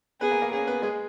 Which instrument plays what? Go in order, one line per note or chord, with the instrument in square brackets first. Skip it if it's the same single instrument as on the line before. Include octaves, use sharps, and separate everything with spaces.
[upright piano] B3 B4 [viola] G#4
[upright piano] A#3 A#4
A#3 A#4
[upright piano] C#4 C#5 [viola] G#4
[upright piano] B3 B4
G#3 G#4